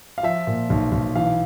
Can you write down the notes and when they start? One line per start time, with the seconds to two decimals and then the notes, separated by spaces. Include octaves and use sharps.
0.18 F5
0.23 F3 E5
0.47 A#2
0.70 B1
0.92 B1
1.15 E3 F5